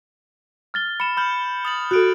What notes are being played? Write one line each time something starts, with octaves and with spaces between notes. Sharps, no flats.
F6 A6 G7
B5 C#7 E7
B5 F6 G6 F#7
D#6 A6 F#7
F#4 A4 F#6 D7